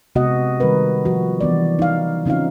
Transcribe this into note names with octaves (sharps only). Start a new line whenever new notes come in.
C3 G#3 B3 F#4 D#5 F#5
D#3 G3 C4 A#4 B4
F3 F#4
E3 B3 D5
D#4 F5
C#3 C4 C#4 D#4 F4 F5